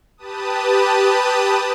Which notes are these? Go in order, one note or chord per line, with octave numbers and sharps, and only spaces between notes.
G4 B4 A5 D#6